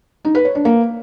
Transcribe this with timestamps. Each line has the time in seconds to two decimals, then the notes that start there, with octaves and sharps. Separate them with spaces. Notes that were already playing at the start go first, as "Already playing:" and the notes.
0.25 D#4
0.35 B4
0.45 C#5
0.55 D4
0.65 A#3